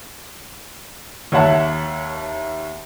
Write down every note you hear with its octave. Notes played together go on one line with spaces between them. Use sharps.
D#2 C#5 E5 F#5 A5